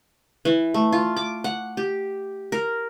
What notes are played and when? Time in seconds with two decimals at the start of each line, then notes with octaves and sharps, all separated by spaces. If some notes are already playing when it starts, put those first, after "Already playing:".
0.45 E3
0.74 A3
0.92 F4
1.17 D6
1.44 F#5
1.77 G4
2.52 A#4